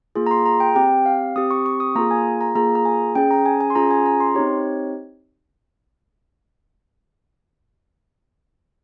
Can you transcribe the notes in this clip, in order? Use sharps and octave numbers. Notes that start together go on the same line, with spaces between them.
A#3 F4 G#4
A#5
C6
A#5
G5
C4 G4 G5
F5
C4 G4 D#6
C#6
C#6
D#6
A#3 F4 G#4 A#5
G#5
A#5
A#3 F4 G#4 A#5
A#5
G#5
C#4 G#4 G5
A#5
G#5
G#5
C6
C#4 F4 G#4 A#5
G#5
A#5
C6
C4 D#4 G4 C#5